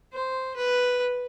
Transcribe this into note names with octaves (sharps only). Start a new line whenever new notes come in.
C5
B4